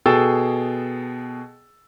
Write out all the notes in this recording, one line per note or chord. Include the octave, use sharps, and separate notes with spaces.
B2 G#4 A4 G5 E6 A6